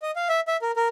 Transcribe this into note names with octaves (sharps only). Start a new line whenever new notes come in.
D#5
F5
E5
E5
A#4
A#4